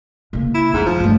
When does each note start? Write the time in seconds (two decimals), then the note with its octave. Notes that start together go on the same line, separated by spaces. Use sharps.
0.33 C#3 A#3
0.54 E4
0.74 F2 G#2
0.86 C#2 F3
1.00 G2 A3